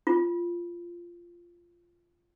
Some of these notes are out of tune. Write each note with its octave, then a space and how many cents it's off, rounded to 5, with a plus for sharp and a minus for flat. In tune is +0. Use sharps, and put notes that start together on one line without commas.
F4 -10